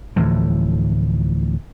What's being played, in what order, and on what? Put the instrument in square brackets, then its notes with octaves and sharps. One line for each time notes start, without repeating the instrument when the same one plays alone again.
[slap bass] D2 A2 E3 F3